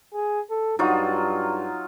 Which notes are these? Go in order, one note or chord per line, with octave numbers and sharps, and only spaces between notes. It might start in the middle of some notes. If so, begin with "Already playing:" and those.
G#4
A4
G2 F#3 D#4 F4